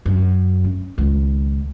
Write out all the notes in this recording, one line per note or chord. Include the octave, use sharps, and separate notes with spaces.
F#2
C#4
C#2 D#3